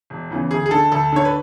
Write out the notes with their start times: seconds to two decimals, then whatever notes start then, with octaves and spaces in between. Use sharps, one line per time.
0.10 E1
0.30 E2 C#3 E3
0.51 D2 G#4
0.66 G#4
0.71 D3 A4
0.92 D2 A4
1.12 D3 C#5
1.25 B4